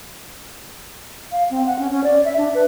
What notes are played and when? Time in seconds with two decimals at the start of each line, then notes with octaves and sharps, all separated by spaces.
1.32 F5
1.50 C4
1.66 F#5
1.79 C#4
1.90 C#4
2.03 D5
2.25 E5
2.37 D4
2.54 B4